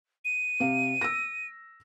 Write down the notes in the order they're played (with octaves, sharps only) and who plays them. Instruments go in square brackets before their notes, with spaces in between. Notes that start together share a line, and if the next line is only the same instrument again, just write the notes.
[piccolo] D#7
[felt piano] C3 F5
E6 A#6